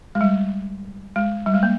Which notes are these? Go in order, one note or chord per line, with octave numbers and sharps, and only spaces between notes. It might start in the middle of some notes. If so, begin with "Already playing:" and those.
G#3
G3
G#3
G3
G#3
A#3